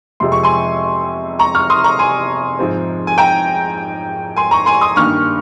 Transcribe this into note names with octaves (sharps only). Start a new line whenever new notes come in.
F2 C3 F3 G#3 C6
C#6
G#5 C6
A#5 C#6
C#6 F6
C6 D#6
A#5 C#6
G#5 C6
G#2 F3 C4
G#5
G5 A#5
G#5 C6
A#5 C#6
G#5 C6
C6 D#6
G2 D#3 A#3 C#6 F6